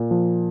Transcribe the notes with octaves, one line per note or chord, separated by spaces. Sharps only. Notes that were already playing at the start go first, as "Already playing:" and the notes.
Already playing: A#2
F3